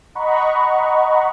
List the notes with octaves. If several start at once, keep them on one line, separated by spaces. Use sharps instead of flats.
D#5 F#5 A#5 B5 C#6